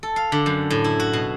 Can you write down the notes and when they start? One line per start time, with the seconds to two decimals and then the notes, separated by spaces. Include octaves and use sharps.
0.03 A4
0.16 F5
0.32 D3
0.46 F#2
0.70 A2
0.84 E4
1.00 F#4
1.13 B2